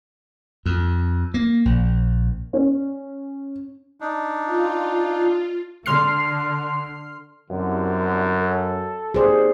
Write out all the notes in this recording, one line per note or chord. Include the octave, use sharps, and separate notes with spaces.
F2
A#3
A#1
C#4
D4 D#4
F4
D3 C6 F6 C7
C2 F#2 D3
A4
D#2 C4 G#4 C5 D5